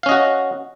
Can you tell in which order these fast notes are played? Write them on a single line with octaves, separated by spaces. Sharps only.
F5 C#4 D#5 F#4